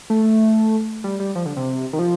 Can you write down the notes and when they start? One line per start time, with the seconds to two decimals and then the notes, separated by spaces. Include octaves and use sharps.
0.10 A3
1.04 G3
1.20 G3
1.35 F3
1.46 D3
1.57 C3
1.93 D#3
1.99 F3